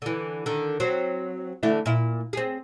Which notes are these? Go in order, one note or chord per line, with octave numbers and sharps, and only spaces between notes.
D3 E3
D3 D#3
F#3 C4
D3 E3 A3
A#2 E4
C4 G#4